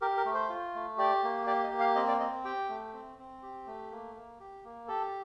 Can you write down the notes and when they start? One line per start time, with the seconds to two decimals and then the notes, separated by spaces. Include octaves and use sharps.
0.01 G4 A#4
0.17 A#4
0.25 A3
0.34 C5
0.49 F4
0.75 A3
0.98 G4 D5
1.24 A#3
1.47 G4 D5
1.64 D#5
1.72 A#3
1.80 F5
1.96 C4 D#5
2.08 D5
2.20 C4 D#5
2.45 G4 G5
2.70 A3
2.93 C4
3.18 C4
3.43 G4
3.67 A3
3.91 A#3
4.15 A#3
4.40 G4
4.64 A#3
4.88 G4 A4